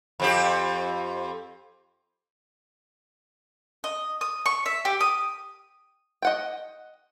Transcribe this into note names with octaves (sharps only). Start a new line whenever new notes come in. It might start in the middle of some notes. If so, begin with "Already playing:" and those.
F2 C4 G4
D#5
D#6
C#6
E5
G4
D#6
D#5 F#5 G5